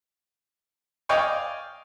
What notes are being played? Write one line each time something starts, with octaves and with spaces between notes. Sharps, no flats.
D5 D#5 F5 G5 G#5 C#6